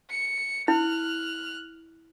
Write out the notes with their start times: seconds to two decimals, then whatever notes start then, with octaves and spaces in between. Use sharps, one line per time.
0.10 C#7
0.68 E4 F6 F#6